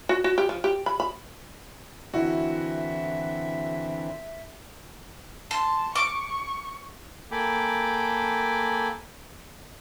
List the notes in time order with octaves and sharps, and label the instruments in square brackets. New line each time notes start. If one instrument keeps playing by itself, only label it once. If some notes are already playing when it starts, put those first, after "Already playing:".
[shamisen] F#4
F#4
G4
F3
G4
B5
B5
[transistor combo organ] D3 E3 C4 [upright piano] E4 [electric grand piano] F#4 [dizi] E5
[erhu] A5 [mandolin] C6
[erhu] C#6 [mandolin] D6
[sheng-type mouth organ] A#3 A4 G5 G#5 B5 D6